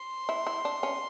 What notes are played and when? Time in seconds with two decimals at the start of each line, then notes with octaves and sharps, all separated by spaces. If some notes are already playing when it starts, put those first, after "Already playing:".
Already playing: C6
0.29 E4
0.47 E4
0.65 D4
0.83 C#4